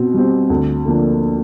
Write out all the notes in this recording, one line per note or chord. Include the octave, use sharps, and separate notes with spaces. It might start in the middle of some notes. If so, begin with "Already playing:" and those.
Already playing: B2 C4
G3 C4
D2
D3 F3 A#3 D4